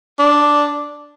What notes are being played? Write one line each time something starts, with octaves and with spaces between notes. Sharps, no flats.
D4